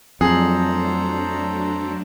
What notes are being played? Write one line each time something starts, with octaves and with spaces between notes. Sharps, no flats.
F2 F#3 A3 D4 G#4 A4 C5 A#5